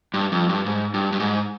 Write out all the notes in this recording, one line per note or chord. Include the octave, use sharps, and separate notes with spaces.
G2
F2
G2
G#2
G2
G2
G#2